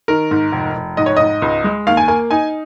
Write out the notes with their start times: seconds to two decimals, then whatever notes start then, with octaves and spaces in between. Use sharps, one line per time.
0.08 D#3 A#4
0.31 G#2
0.52 F1
0.76 F1
0.97 G#2 D#5
1.06 C#5
1.16 G#2 D#5
1.42 C#2
1.64 G#3
1.87 D#2 F5
1.97 G#5
2.08 A#3 G#5
2.31 D#4 G#5